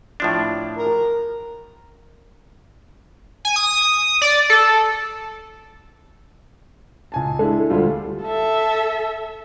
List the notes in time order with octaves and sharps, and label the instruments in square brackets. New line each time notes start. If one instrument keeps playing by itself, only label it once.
[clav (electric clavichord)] A2 F3 D4
[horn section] A#4
[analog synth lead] G#5
D#6
D5
A4
[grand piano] C#2 G#5 A5
[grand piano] G#3 D4 E4 [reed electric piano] A4
[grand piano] D2 G3 F4
[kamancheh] A4 E5